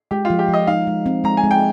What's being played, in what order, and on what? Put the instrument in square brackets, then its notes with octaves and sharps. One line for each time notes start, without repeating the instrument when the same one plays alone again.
[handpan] G#3 [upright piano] G4
[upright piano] F4
[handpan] F3
[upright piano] G4
[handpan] F3 [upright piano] D#5
[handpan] D#4 [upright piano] F5
[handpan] G#3
C4
[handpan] G#3 [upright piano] A#5
[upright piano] G#5
[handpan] G#3
[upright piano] G5